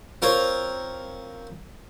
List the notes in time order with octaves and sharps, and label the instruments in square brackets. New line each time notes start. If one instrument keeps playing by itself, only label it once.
[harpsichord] C4 F4 A#4 C5 C#5